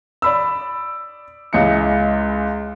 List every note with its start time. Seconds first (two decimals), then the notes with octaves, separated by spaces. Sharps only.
0.22 D5 B5 E6
1.53 C#2 G#3 E4 C#7